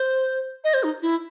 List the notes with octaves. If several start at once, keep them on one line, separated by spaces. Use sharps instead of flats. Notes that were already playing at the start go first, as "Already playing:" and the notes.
Already playing: C5
D#5
C5
D#4
E4